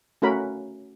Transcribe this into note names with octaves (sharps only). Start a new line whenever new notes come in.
A3 C#4 F#4 A#4 B5